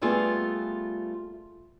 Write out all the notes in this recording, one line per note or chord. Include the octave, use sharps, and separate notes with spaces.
G3 A3 B3 F4 G#4